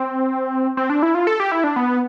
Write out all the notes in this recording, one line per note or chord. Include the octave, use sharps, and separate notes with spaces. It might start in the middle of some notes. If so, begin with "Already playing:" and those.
Already playing: C4
C4
D4
E4
F4
A4
G4
E4
D4
B3